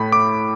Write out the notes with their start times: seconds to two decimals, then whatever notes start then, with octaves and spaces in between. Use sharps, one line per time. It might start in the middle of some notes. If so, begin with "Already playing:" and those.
Already playing: A2 A3 B5
0.12 D6